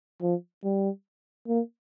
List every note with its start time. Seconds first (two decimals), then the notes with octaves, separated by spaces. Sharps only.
0.22 F3
0.64 G3
1.48 A#3